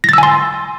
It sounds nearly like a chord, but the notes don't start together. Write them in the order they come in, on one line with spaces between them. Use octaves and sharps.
A#6 A6 E6 G#5 C6